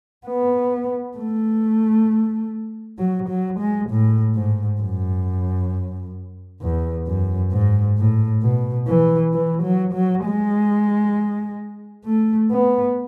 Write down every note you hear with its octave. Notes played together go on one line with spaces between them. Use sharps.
B3
A3
F#3
F#3
G#3
A2
G#2
F#2
E2
F#2
G#2
A2
B2
E3
E3
F#3
F#3
G#3
A3
B3